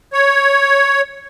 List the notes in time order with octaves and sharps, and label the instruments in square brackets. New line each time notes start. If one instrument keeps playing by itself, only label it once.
[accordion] C#5